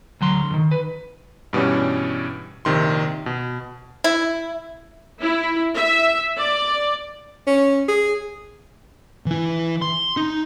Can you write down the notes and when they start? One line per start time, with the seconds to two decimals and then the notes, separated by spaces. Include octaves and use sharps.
0.21 D2 F#3 C6
0.50 D2 D#3
0.71 B4
1.53 G2 B2 E3 G3 C#4
2.65 A#1 C3 D#3 C6
3.26 B2
4.04 E4
5.21 E4
5.74 E5
6.36 D5
7.47 C#4
7.88 G#4
9.26 E3 E4
9.82 C6
10.17 D#4